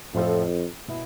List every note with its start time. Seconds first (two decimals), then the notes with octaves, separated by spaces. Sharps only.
0.14 F2 A2 F3 C4 F4 A4
0.88 B2 B3 E4